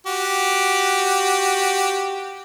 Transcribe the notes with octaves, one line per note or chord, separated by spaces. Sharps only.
F#4 G4